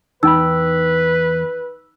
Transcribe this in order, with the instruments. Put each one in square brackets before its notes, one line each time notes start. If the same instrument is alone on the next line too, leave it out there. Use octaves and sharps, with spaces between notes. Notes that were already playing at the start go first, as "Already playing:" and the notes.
[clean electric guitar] E2 G5 B5 [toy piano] D#4 [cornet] B4 [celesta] E6